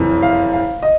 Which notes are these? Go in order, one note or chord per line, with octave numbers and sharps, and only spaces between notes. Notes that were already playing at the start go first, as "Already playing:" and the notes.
Already playing: F#1 F2 C3 E3
F5
F5
D#5